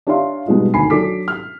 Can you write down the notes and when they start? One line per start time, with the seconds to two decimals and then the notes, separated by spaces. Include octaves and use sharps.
0.07 D4 G4 C#5 E5 F5 C6
0.46 B2 G3 G#3 D#4 F4
0.74 D2 D#3 G#5 B5 C7
0.90 F#3 D4 A4 D6 B6
1.28 F6